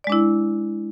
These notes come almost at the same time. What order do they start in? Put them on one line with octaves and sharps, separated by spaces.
D5 G#3 D4 E4